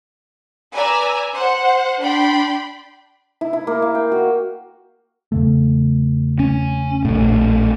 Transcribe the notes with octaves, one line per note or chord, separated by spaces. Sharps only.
B4 D5 G#5 A#5 E6
C5 F#5
D4 G5 B5 C6
E4
E4
A#3
F5
G5
F#4
E2 C#3 A3
C#4
A#1 A2